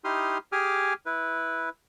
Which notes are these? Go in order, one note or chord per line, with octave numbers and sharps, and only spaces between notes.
D#4 E4 G4 C6 D#6 F6
G4 G#4 G#5 D6 D#6 F6
E4 B4